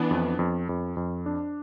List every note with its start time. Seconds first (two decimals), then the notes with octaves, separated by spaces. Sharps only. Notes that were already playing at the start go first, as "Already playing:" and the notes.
Already playing: E3 B3 D4
0.11 F2
0.39 F2
0.69 F2
0.97 F2
1.26 D4